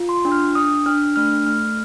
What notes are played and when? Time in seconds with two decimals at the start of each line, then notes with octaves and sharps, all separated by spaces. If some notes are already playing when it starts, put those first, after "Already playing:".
Already playing: F4
0.09 C6
0.25 D4
0.32 F6
0.55 D4 D#6
0.86 D4 F6
1.16 A3 F6
1.47 A3 F6